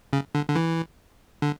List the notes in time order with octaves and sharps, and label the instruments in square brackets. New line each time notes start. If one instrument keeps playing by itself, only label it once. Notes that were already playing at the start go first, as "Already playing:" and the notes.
[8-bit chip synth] C#3
D3
D3
E3
D3